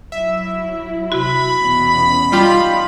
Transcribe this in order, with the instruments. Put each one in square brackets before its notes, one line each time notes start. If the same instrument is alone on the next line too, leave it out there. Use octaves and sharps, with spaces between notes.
[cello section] F#3 E4 [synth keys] E5
[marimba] C3 F#4 [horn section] B5
[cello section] E2 B2 C#4
[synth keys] G3 F4 G4 [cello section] D#4